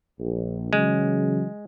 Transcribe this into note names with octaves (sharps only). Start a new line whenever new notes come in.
A#1
C#3 E3 F#3 G#3